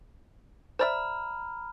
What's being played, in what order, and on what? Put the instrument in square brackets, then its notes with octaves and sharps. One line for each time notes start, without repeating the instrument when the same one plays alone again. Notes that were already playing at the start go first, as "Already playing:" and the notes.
[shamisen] C5 D5 E5 [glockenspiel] A#5 B5 F6